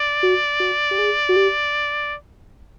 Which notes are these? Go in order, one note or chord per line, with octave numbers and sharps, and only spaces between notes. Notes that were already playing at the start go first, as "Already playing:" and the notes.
Already playing: D5
F#4
F#4
G4
G#4
F#4
G4